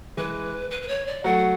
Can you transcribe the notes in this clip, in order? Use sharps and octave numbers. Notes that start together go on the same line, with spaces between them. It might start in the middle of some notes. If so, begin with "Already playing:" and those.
E3 G#3 B4
B4
B4
C#5
D5
F#3 A3 F#5